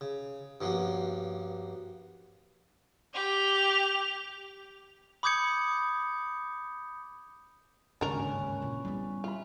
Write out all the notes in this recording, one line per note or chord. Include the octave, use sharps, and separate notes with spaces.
C#3
G2 F3 A#3 B3 C#4 F#4
G4 F7
B5 D6 D#6 G6 G#6 C#7
G1 D#2 G#2 C#3 C#4 D4 A#4 B4
A#2 E3
G3 B3 E4
F4 E5 B5